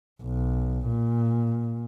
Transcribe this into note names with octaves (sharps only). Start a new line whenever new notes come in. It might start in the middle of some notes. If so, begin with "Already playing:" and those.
B1
A#2